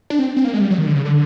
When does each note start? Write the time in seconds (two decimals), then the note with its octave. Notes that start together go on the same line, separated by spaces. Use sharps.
0.10 D4
0.19 C4
0.36 C4
0.44 A#3
0.54 G#3
0.61 G3
0.70 F#3
0.78 D#3
0.87 D3
0.95 C#3
1.05 D3